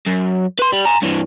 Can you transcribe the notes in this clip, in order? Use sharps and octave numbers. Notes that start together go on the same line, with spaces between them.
F#2
B4 C6
G3
G#5 A#5
G2 E3